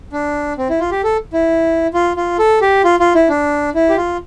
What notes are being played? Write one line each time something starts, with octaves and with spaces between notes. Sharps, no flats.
D4
C4
E4
F4
G4
A4
E4
F4
F4
A4
G4
F4
F4
E4
D4
E4
G4
F4